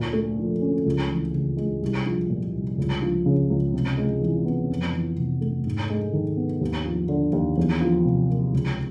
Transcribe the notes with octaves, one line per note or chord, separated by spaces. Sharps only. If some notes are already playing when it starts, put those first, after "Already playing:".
Already playing: D2 A#2
A3
F3
C#4
C#2
E3
C#3
G#3
C2
F3
A#2
C2
C#2
F3
C#3
C#2
C3
G#3
E3
B3
F2
E3
C3
A3
G#2
G#3
D#3
B3
D#2
F3
D3
D#2
E2
F3
C3
A#3
C#2